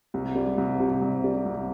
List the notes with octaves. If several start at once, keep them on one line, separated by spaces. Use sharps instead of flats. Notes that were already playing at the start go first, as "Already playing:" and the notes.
C2
G3
C2
C3
C2
G3
C2